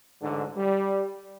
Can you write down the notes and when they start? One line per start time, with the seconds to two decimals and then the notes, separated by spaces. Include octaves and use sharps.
0.21 A1 G#2 D3
0.55 G3